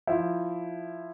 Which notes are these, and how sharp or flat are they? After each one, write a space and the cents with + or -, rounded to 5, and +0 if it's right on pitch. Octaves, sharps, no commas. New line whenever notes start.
F3 +0 E4 +0